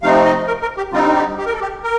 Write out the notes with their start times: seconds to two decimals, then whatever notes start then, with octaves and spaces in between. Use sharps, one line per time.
0.02 C3 F3 A3 C4 D#4 F5
0.25 D#5
0.47 A#4
0.62 A#4
0.77 G4
0.92 D3 G3 C4 D#4 F4
1.15 G4
1.38 G4
1.46 A#4
1.53 A4
1.61 G4
1.83 A#4